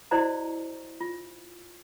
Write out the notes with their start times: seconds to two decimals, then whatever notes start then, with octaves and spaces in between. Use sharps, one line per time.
0.11 E4 F#4 C5 D5 D#5 A#5
1.01 F4